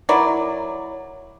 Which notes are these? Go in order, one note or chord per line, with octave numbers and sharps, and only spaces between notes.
F#3 E4 A#4 D5